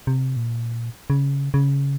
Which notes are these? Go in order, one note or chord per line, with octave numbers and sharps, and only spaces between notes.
C3
A#2
C#3
C#3